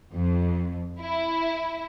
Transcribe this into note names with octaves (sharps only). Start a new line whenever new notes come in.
F2
E4